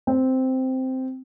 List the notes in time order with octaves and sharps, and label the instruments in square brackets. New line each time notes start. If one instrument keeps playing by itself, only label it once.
[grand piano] C4